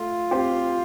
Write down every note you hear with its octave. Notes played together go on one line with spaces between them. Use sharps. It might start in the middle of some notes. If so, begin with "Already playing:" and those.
Already playing: A3 F4
C4 G4 C5